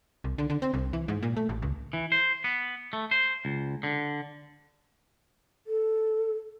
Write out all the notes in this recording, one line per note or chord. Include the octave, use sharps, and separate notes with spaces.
C2
D3
D3
C4
C2
E3
G#2
A#2
A3
A1
C#2
E3
C5
B3
A3
C5
C#2
D3
A4